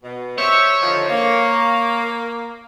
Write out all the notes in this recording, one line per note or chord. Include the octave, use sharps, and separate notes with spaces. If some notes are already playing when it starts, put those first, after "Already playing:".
B2
G4 C5 C#5 E5
D3 D#3 F3
A#3